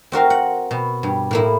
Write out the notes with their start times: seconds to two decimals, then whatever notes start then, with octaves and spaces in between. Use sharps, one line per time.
0.12 C4 F#4 A#4 F5
0.30 F#5
0.71 B2
1.03 G2
1.31 A2 A#3 E4